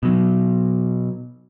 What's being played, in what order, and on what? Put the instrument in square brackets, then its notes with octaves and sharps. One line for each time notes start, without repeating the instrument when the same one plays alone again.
[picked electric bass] B2 F#3